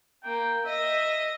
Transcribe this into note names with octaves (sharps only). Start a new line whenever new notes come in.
A#3 G5
D#5 E5